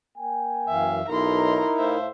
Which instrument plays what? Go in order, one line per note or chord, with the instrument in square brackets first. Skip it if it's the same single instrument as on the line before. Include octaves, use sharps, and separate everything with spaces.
[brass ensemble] A#3 G5 G#5
[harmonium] F#2 E3 [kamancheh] E5 F5
[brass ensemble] B1 [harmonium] D#4 E4 A#4 [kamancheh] A#5 C6
[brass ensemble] A2 F5 [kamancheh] C5 E5